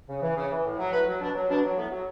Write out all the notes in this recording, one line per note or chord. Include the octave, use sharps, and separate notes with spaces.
C#3
E3
C#3
E3
A2
F#3
A2 B4
F#3
B2 D4
F#3
B2 D4
F#3
A2 B3
F#3